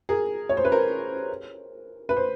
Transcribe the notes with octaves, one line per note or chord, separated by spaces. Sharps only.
G#4 A#4
C#5
C5
B4
A#4 C5
B4
C5